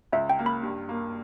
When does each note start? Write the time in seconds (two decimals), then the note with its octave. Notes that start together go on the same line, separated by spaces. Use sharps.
0.12 C#2 E5
0.30 G5
0.39 A#3
0.46 B5
0.63 G2
0.89 A#3